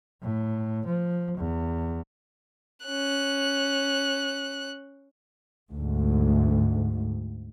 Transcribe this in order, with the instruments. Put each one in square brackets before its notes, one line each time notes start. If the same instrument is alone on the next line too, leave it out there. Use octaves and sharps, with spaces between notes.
[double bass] A2
F3
E2
[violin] C#4 F#6
[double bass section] D2 G#2